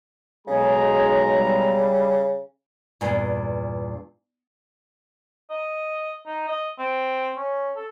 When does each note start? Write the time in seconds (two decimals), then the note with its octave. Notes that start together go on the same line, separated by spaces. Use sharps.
0.47 B1 C#3 G#3 G#4 A#5
1.31 G3
3.01 E2 G2 A#2
5.50 D#5
6.26 D#4
6.48 D#5
6.78 C4
7.36 C#4
7.76 A4